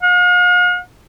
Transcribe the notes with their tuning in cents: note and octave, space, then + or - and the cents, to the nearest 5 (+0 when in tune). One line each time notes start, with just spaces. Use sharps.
F5 +45